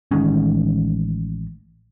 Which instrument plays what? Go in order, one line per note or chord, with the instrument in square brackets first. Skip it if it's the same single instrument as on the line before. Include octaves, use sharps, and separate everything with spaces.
[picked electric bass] A1 D#3 G#3 C#4